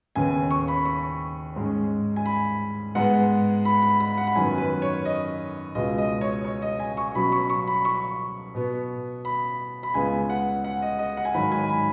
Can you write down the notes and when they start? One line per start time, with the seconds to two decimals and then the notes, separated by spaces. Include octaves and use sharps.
0.16 D#2 C#3 B3 G#5
0.51 C#6
0.68 B5
0.85 C#6
1.56 G#2 G#3 C#4
2.16 G#5
2.26 B5
2.95 G#2 G#3 B3 F#5
3.65 B5
3.82 B5
4.00 B5
4.17 F#5
4.27 B5
4.35 F#2 D#3 B3 G#5
4.58 B4
4.82 C#5
5.05 D#5
5.75 C#2 B2 G#3 B3 D#5
5.98 D#5
6.21 C#5
6.45 C#5
6.62 D#5
6.79 G#5
6.97 C#6
7.15 B2 F#3 C#4 B5
7.32 C#6
7.50 C#6
7.67 B5
7.85 C#6
8.55 B2 B3
9.25 B5
9.83 B5
9.94 C#2 C#3 G#3 B3 G#5
10.30 F#5
10.64 F#5
10.82 D#5
10.99 D#5
11.17 F#5
11.25 G#5
11.34 G#2 D#3 F#3 B5
11.52 G#5
11.69 B5